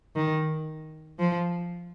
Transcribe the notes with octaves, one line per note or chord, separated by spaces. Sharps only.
D#3
F3